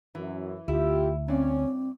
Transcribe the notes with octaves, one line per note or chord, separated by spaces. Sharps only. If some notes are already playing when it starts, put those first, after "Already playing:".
F#2 E3
D2 E4 F4 G4
G2 C4 C#4 D5